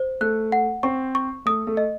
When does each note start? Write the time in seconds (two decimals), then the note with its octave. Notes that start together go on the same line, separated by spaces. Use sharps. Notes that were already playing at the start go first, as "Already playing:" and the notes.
Already playing: C5
0.21 A3 A4 F#6
0.52 F#5
0.83 C4 C5 C#6
1.15 C#6
1.46 A3 A4 D#6
1.67 A3 A4
1.77 D#5